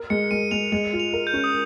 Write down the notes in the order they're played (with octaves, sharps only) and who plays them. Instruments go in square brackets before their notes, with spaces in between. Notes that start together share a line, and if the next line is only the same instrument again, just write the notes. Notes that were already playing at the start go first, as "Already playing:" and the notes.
Already playing: [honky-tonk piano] A#4
[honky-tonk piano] G#3 [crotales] C#7
[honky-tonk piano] G#3 [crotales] D#7
[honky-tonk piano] G#3 [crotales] F7
[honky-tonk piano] G#3 [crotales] F7
[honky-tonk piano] F4
[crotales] F7
[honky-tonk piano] A#4
[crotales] G6
[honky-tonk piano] C#4
[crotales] D#6